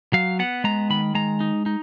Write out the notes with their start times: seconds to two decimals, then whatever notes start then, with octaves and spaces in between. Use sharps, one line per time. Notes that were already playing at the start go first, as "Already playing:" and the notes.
0.13 F#3 F5
0.39 B3 F#5
0.64 G#3 A#5
0.90 D#3 B5
1.15 G#3 A#5
1.40 D#4
1.66 D#4